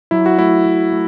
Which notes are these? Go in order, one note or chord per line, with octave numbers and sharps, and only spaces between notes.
F#3 E4
F#4
A3 E4
F#3
A3